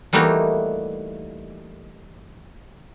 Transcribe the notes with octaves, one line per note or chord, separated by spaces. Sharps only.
E3 G3 A3 A#3 D#4 F#4